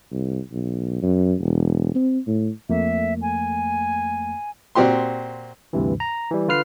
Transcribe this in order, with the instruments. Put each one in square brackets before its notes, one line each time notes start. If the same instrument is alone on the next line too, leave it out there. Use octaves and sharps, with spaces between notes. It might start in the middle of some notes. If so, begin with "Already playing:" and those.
[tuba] C2
B1
F#2
E1
C4
A2
[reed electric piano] F2 A3 A#3 [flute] E5
[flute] G#5
[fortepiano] A#2 C4 F#4 G4 C6
[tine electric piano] D2 G2 C3 E3
A#5
E3 G3
D3 F4 B4 F6 C7